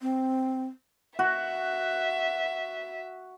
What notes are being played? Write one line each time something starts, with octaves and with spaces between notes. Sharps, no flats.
C4
F#4 E5